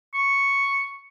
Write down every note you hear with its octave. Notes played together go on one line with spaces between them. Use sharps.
C#6